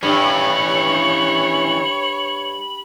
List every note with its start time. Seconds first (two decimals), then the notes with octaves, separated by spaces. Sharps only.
0.03 G2 E3 C#4 C#5 B5